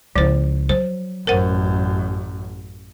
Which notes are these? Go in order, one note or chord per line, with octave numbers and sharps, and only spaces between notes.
C#2 F3 E4 C5
F#3 C5
A1 F#2 A#4 C5 F#5